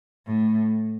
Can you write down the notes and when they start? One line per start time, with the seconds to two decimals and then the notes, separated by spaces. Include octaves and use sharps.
0.26 A2